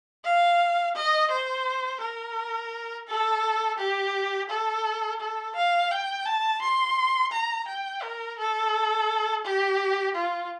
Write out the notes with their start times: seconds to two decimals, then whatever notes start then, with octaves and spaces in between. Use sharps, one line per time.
0.25 F5
0.95 D#5
1.31 C5
2.01 A#4
3.08 A4
3.78 G4
4.49 A4
5.20 A4
5.56 F5
5.91 G5
6.26 A5
6.62 C6
7.32 A#5
7.68 G5
8.03 A#4
8.39 A4
9.45 G4
10.15 F4